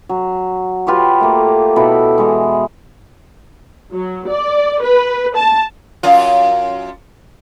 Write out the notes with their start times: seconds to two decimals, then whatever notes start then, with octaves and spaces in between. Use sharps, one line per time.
0.09 F#3
0.87 F4 G4 B4 C#5
1.20 A3 A#3
1.76 B2 E4 A4
2.18 E3 G#3
3.92 F#3
4.28 D5
4.82 B4
5.37 A5
6.03 F#2 F4